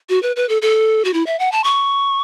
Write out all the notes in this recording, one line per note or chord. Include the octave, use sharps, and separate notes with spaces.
F#4
B4
B4
A4
A4
F#4
E4
E5
F#5
A5
C#6